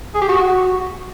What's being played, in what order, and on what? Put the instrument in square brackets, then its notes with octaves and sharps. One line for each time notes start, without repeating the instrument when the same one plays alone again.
[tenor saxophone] G#4
G4
F#4